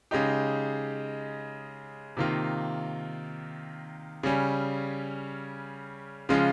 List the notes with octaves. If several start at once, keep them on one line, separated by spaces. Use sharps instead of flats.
C#3 G#3 D#4 G4
C3 D#3 A#3 F4
C#3 G3 C#4
C#3 F3 G#3 C#4 F4